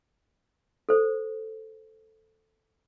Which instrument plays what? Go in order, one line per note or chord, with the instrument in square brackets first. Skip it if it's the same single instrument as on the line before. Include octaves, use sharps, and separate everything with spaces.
[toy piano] A4 C5